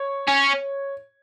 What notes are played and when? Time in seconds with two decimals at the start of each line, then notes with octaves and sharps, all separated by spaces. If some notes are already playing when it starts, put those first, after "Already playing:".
Already playing: C#5
0.28 C#4